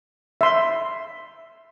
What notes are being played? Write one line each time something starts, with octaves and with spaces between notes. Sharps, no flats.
E5 C6